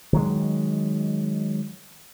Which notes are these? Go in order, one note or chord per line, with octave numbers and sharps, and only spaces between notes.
D#3 F#3 G#3